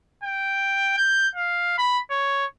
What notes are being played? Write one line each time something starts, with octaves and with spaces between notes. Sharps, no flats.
G5
G6
F5
B5
C#5